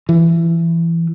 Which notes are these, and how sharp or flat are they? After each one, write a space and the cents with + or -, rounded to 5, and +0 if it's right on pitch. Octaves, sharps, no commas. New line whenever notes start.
E3 +20